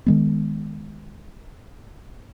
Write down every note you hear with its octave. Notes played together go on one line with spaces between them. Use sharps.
D#3 G#3 B3